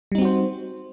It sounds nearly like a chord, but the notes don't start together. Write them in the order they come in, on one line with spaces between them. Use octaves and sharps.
G3 D#4 C4 F#4 C5